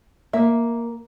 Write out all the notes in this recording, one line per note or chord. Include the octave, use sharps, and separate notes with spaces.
A#3 E5